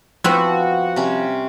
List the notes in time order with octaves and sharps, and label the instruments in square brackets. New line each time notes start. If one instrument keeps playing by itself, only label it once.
[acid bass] F3 [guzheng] B3 C4 E4 [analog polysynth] F#4
[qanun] C3 G3 C#4